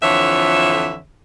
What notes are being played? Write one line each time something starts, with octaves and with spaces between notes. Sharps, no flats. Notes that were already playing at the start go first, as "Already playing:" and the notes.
F2 D3 E3 F3 C#5 E5